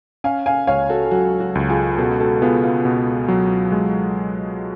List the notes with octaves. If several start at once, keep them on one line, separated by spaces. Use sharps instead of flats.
C#4 F5 G#5
F5 G#5
C#2 C#5 F5
F#4 A4
F#3 F#4
F#4
C#2
F4 G#4
B2 F#4 A4
F#4 A4
B3 F4 G#4
F4
B2
F#3
G#3